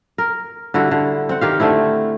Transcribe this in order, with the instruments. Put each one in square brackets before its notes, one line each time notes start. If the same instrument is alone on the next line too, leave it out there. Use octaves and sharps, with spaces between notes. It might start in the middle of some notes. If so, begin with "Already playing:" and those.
[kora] A#4
D3 G3 E4 F#4
D3
C4 F#5
D#3 G4 F5
D3 A3 C4 E4